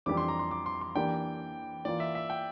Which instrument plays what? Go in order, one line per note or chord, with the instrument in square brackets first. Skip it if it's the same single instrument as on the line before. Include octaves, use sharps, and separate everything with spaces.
[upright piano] F2 E3 G3 D4 G4 [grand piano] D6
[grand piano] C6
A#5
C6
D6
C6
C6
[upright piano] E3 A#3 D4 G4 [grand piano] G5
[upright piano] E3 A#3 F4 [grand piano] D5
[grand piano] E5
E5
G5